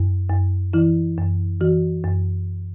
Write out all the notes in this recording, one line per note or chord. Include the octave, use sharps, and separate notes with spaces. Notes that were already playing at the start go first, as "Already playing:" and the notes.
Already playing: F#2
F#2
E3 E4
F#2
E3 F#4
F#2